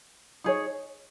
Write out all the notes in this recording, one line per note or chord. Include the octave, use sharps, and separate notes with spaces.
D#4 G#4 C#5